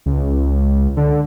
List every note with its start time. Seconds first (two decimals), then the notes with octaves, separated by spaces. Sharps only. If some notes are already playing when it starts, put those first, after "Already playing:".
0.06 C#2
0.97 D3